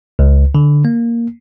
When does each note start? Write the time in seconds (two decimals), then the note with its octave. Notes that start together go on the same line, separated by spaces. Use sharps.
0.19 C#2
0.55 D3
0.85 A#3